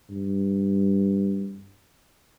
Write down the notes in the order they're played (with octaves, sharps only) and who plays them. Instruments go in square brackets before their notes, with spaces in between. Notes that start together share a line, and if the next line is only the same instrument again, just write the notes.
[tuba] G2